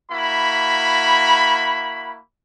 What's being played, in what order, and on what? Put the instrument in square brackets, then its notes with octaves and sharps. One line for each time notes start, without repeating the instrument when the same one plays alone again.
[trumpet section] A#3 E4 F#4 B5